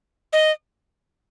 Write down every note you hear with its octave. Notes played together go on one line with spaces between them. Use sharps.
D#5